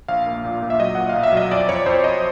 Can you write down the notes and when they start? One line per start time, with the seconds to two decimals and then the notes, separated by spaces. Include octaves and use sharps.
0.08 A#1 F5
0.27 A#3
0.44 A#2
0.62 A#2
0.70 E5
0.80 F#3 D#5
0.95 A#2 F#5
1.09 F5
1.16 B1
1.23 E5
1.33 F#3 D#5
1.51 F2 D5
1.69 F2 C#5
1.86 F2 C5
2.04 F2 D#5